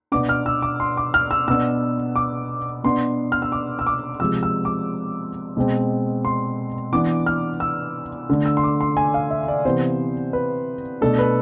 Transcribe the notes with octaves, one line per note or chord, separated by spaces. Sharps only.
B2 B3 D4 D6
F6
E6
D6
C6
D6
F6
E6
B2 B3 D4 E6
D6
B2 B3 D4 C6
F6
E6
D6
E6
D6
C3 F3 G#3 E6
E6
D6
B2 G#3 C4
C6
E3 B3 D4 D6
F6
E6
D3 A3 D4
E6
C6
D6
C6
G#5
F5
E5
D5
C3 E3 B3 C5
B4
B2 A3 D4 A4
B4